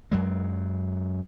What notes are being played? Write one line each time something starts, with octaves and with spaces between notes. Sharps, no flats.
F#2 F#3 G#3